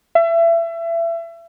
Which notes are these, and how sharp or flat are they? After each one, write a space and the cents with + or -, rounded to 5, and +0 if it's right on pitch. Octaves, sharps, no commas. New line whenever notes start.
E5 +30